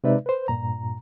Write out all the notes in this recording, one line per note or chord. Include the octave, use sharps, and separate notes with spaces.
C3 G#3 D#4 B4 D5 E5
B4 C5
G2 A#2 A#5